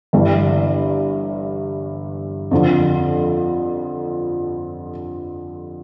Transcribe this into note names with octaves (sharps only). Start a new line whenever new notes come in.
G1 G2 E3
F2 D3 F3